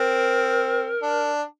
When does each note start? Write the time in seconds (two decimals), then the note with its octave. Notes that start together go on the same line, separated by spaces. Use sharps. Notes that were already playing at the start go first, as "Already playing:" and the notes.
Already playing: C4 A#4
1.02 D4